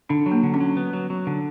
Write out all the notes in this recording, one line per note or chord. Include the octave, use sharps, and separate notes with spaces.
D3 D4
F#3
A#3
D3
C#4
F#3
B3
F#3
F#3
D3